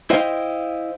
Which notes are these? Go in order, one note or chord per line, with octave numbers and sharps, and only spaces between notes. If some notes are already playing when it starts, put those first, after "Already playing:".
E4 C5 D#5 F5 G5